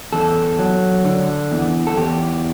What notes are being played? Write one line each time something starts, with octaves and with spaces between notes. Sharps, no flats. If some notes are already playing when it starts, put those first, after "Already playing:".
E2 A4
F#3
D3
E2
A4
E2 G4